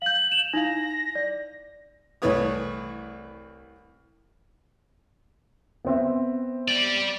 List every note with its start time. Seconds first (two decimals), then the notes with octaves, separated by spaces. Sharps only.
0.02 F5 G6 F#7
0.32 E7 F7
0.53 D#4 E4 F5 A#6
1.15 D5
2.22 C2 E3 A3 B4 C#5 D#6
5.85 B3 C4 E5
6.68 D5 G5